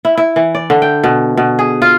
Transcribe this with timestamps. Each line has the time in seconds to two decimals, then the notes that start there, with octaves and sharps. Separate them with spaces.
0.05 E4
0.17 E4
0.36 E3
0.55 D5
0.70 D3
0.82 G5
1.04 B2
1.37 B2
1.59 G#4
1.82 F4